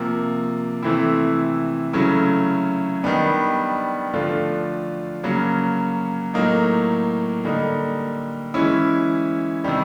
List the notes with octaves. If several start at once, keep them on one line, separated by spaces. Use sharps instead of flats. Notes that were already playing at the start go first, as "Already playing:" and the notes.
Already playing: C3 F3 A#3
C3 E3 A3 C4 E4
C#3 F#3 A3 C#4 E4
D#3 G3 B3 D4
D3 F3 A3 D4 F4
C#3 F#3 A#3 C#4
A2 F#3 A#3 D#4
D3 G3 A#3 D#4
E3 G#3 C#4 E4
C3 D#3 G3